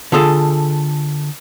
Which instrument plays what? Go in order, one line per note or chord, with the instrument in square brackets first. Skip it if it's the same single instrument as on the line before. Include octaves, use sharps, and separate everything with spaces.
[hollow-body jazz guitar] D3 F4 G#4 A4